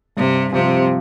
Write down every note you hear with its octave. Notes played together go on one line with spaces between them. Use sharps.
G2 C3
C3 F3 C4 G4